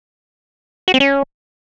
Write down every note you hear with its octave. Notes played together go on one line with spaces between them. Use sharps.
F#4
C4
C#4